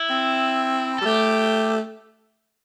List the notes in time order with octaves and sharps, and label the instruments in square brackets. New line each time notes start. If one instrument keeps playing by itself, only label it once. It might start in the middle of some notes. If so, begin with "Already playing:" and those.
Already playing: [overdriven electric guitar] E4
[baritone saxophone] C4
[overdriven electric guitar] A4
[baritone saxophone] G3
[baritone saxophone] A3 [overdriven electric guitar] G4